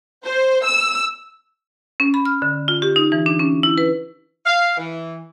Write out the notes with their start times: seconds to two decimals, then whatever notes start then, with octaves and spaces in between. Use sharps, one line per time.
0.24 C5
0.65 E6
2.00 C#4
2.14 B5
2.25 F6
2.42 D3
2.68 F4
2.82 G4
2.96 D#4
3.12 E3
3.26 D4
3.39 C#4
3.63 E4
3.78 B4
4.46 F5
4.77 E3